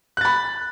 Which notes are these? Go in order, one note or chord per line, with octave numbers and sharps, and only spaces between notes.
B5 F#6 A6